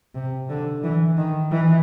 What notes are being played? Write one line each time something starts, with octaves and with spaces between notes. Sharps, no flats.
C3
D3
E3
D#3
E3